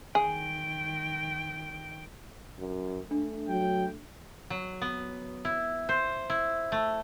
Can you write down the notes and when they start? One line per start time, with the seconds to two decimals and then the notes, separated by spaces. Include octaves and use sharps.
0.15 D#3 G#4 G5
2.59 F#2
3.11 A3 D4
3.49 F#3 G5
4.50 F#3
4.81 B3
5.45 E4
5.89 C5
6.30 E4
6.72 A3